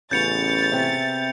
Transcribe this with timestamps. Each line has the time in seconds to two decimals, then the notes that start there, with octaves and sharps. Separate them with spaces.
0.11 A1 C#3 B3 C#4 G6 A6 C#7 F7
0.71 C3 E5